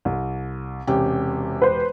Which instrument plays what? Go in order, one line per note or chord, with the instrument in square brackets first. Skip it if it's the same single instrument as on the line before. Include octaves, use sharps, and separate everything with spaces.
[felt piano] C2
[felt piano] E1 G4 [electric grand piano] C3 C#4
[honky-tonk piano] B4 C5